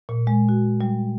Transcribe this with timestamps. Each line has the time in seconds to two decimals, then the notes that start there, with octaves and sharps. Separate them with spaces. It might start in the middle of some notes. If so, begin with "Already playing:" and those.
0.09 A#2
0.27 G#3
0.49 F#4
0.81 G3